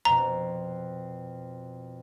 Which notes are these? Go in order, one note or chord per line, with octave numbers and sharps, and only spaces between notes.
F2 B2 A#5